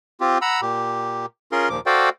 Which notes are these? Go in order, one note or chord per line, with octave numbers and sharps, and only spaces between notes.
C4 F4 G4
F#5 A#5 B5 E6
A#2 G4
C#4 F4 G#4 A#4 C6
D#2 A#2 F3 D6
F#4 A4 C5 D5 F5 G5